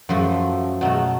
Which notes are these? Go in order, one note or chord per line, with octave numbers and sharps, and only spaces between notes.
F#2 F3 A3
B2 F#3 A3